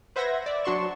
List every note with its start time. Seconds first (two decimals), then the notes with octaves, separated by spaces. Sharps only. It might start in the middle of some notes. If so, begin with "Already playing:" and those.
0.16 B4 C5 E5 F#5 G#6 A#6
0.46 D5 E5
0.65 F#3 D4 F#4 C6 C#6 E7